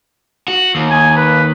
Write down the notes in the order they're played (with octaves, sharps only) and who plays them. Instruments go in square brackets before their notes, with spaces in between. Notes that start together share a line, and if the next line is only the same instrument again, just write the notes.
[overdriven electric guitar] F#4
D#2
[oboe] G#5
B4